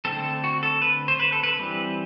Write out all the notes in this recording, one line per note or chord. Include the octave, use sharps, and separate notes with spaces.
D3 A3 C4 A4
F#4
A4
B4
C5
B4
A4
B4
E3 G3 C4